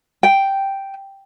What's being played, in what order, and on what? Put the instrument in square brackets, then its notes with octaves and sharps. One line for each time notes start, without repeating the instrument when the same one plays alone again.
[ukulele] G5